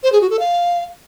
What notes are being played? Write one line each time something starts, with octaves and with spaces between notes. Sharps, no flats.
C5
G#4
F#4
A4
F5